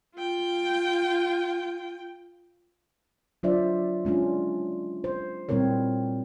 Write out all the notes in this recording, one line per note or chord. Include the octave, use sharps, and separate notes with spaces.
F4 G5
F#3 D4 F4 C5 D5 E5
G#3 C#4 D4 F4
C5
A#2 G3 C4 E4 A#4 C#5